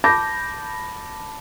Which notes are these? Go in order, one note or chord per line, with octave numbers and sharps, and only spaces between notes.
A5 B5 D6 G6 A#6